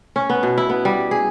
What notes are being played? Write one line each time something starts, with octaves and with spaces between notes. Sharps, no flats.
C#4
B3
B2
E4
B3
G3
G#4